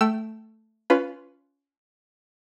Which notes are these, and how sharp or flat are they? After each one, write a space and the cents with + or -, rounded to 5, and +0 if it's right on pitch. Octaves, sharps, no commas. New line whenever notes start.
A3 +0 G5 -20 E6 +20
C#4 +20 F4 -5 B4 +10